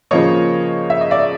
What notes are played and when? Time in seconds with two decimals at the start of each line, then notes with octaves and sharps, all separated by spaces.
0.11 C#3 F3 A#3 C#5 D#5
0.90 E5
1.01 D#5
1.11 D5 E5